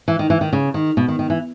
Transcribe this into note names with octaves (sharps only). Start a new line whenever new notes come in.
E3
D#3
E3
D#3
C#3
D#3
B2
D#3
D#3
E3